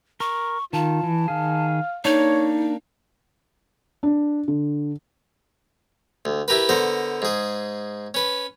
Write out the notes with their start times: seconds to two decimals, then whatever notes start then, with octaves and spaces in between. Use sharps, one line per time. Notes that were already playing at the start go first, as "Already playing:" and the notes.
0.20 A#4 C#6
0.73 D#3 F4 A5
1.03 E3
1.28 D#3 G#4 F5
2.05 A#3 D4 D#4 C#5
4.03 D4
4.48 D3
6.25 D2
6.48 E4 G4 A#4 B4
6.69 D3 B3 A#4 C5
7.22 G#2 G#4
8.14 C#4 B4